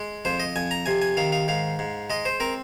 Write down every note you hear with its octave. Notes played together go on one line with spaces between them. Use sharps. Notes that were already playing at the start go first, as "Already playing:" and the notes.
Already playing: G#3
F2 C5
D#5
F2 G#5
A#5
C3 G#5
G#5
D#3 F5
F5
G#2 F5
G#2
G#3 D#5
C5
C4 A#4